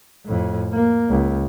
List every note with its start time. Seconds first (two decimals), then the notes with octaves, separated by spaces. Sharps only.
0.25 F2 A2
0.73 A#3
1.09 C#2